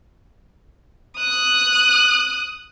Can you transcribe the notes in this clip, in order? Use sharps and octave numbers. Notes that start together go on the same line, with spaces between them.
D#6 F#6